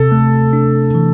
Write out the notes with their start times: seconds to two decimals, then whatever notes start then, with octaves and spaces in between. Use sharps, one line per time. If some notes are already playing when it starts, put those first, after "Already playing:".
Already playing: C3 A4
0.12 A3
0.53 D4
0.95 E3